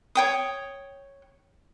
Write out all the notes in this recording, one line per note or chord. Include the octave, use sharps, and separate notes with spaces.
C#5 G5 D#6